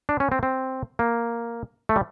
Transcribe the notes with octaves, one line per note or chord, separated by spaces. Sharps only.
D4
C#4
C4
C4
A#3
A3
G3